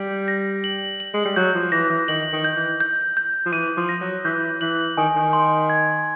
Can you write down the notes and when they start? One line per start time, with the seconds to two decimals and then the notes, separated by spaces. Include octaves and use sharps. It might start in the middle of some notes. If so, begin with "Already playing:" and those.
Already playing: G3 G6
0.28 A#6
0.64 F#7
1.00 F#7
1.14 G#3
1.25 G3
1.36 F#3 G6
1.54 F3
1.72 E3 A#6
1.90 E3
2.08 D#3 F#7
2.33 D#3
2.44 G6
2.56 E3
2.80 G6
3.17 G6
3.46 F3
3.52 E3 D#7
3.77 F3
3.89 A#6
4.01 F#3
4.25 E3 G6
4.61 E3 F#7
4.97 D#3 G#5
5.16 D#3
5.33 C6
5.70 G#6